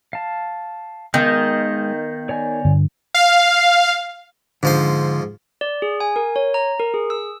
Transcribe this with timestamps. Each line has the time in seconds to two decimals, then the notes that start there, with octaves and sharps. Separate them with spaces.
0.13 F5 A5
1.14 D#3 G#3 B3 D#6 G6 A#6
2.29 C#5 D5 G#5
2.65 G2 D3
3.14 F5
4.63 G#2 D3 F3 C5
5.61 D5
5.82 G#4
6.00 G#5
6.16 A#4
6.36 C#5
6.54 A#5
6.79 A#4
6.94 G#4
7.10 E6